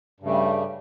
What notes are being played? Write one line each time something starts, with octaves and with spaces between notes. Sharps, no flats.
G2 C#3 G3 A3